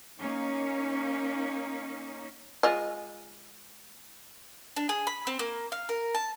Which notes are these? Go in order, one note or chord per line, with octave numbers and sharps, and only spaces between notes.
A#3 C#4 D#4
G#3 F4 D#5
D4
G#4
B5
C4
A#3
F5
A#4
A5